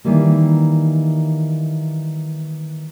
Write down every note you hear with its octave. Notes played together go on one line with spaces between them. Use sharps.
D#3 E3 G3 A#3